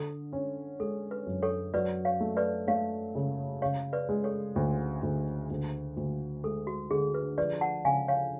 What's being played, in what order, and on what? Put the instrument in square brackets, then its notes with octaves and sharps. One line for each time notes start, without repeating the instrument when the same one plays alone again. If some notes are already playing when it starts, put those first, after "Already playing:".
Already playing: [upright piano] D3 [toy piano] A4
[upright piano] C#4
[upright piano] G#3 [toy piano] A4
[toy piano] B4
[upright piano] F#2
[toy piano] A4 C#5
[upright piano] F#3 [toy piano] B4 D5
[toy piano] C#5 F5
[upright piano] A3
[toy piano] B4 D5
[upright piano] A3 [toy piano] C#5 F5
[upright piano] C#3
[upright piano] C#3 [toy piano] C#5 F5
[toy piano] B4 D5
[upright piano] G#3
[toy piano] A4 C#5
[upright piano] D2
D2
D2
D2
[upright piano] G#3 [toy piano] A4
[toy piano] F#4
[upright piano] D3 [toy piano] G#4
[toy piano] B4
[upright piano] F3 [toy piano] B4 D5
[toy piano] F#5 A5
[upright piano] C#3 [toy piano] F5 G#5
[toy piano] C#5 F5